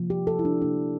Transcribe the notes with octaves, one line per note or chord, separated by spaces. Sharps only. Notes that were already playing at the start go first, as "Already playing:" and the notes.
Already playing: C3 F3 A#3
G4
A4
E4
D4
C3 F3 A#3 D4